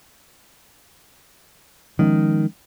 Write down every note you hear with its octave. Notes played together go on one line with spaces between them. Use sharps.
D#3 F3 G#3 C#4